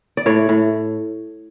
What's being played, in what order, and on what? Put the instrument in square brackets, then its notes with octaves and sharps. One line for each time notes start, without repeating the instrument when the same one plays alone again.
[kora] D5
A2 C#5
A2